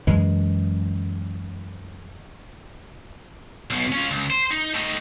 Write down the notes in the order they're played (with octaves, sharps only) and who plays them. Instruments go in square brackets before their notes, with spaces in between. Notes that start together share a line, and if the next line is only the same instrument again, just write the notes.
[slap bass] F#2 E3 G#3
[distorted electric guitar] B1 B2
C#4 F4
C#2
C5
D#4
A2 D#4